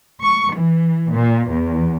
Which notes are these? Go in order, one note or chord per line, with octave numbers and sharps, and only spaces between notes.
C#6
E3
A#2
E2